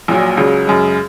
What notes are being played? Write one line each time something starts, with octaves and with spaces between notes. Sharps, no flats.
A#1 A#2 F#3
C#2 C#3 F#3
F#2 C#3 G#3